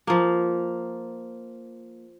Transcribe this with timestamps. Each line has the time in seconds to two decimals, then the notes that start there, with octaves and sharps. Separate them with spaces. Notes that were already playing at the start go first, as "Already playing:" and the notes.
0.07 F3 A#3